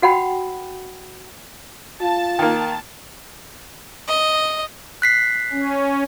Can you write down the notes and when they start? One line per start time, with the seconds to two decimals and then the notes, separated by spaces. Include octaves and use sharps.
0.02 F#4 F#5 G5 B5
2.01 F4 A5
2.39 D#3 A#3
4.08 D#5
5.02 F#6 B6 C7
5.52 C#4